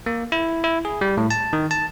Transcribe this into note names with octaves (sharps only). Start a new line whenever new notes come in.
A#3
E4
E4
G#4
G3
A2
A5
D#3
A5